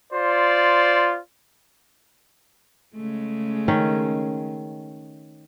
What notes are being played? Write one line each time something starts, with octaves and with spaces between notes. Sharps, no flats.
F4 C5 D5
C#3 G#3 A3
D#3 C#4